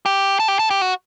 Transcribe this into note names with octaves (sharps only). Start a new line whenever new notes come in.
G4
A4
G4
A4
G4
F#4